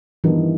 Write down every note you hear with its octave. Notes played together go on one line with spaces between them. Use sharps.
G2 D#3 E3 G3 B3